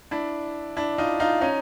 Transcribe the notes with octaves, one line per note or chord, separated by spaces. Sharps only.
D4 E4
D4 E4
D#4 F4
D#4 F4
C#4 D#4